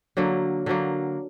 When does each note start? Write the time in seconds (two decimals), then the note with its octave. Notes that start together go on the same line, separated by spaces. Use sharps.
0.17 D3 F#3 A#3
0.66 D3 F#3 A#3